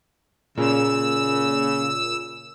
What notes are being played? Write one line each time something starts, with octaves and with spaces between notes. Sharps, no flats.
A#2 C#3 E6